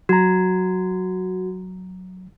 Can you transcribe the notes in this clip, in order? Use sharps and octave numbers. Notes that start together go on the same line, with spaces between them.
F#3 F#4 A#5